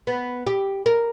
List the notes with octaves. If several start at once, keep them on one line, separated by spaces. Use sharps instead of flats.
B3
G4
A#4